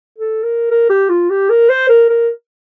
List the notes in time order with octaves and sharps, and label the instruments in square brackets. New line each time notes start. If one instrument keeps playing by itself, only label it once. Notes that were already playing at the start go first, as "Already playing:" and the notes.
[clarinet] A4
A#4
A#4
G4
F4
G4
A#4
C5
A#4
A#4